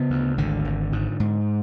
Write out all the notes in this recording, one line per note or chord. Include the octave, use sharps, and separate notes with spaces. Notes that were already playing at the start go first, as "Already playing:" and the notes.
Already playing: C#3 B3
D2
G#1 D3
G#1
G#2
G#2